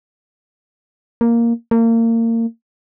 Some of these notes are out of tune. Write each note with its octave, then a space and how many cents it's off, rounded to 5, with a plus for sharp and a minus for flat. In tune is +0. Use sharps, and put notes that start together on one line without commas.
A#3 +0
A#3 -30